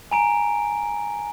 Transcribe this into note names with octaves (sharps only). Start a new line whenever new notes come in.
G#5 A#5 D7